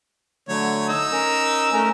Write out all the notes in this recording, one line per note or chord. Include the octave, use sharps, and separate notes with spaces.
D3 F#3 A3 C#5
D#4 E6
C#4 A#4
A3 C#4 A#4